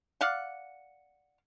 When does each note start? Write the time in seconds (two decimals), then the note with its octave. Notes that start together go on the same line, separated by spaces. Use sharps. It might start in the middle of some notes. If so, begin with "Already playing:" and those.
0.21 D5 F5 F#5